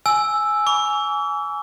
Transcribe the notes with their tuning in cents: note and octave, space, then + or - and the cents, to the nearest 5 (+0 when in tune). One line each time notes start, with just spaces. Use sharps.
G#5 +10 E6 +0
G#5 +0 B5 +0 D6 -45